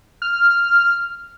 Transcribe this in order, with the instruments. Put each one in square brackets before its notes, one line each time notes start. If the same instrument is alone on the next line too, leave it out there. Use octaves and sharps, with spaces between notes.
[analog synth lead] F6